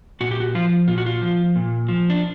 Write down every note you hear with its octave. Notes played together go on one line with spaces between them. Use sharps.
A#2 F#4
G4
F#4
F3 F4
A#2 F4
F#4
F4
F3
A#2
F3
D4